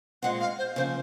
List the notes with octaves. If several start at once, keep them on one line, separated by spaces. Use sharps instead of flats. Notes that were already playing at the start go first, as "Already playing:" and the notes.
A#2 G#3 C4 F#5
F5
C5
C#3 F3 A#3 C5